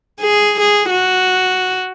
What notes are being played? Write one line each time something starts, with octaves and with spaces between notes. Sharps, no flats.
G#4
G#4
F#4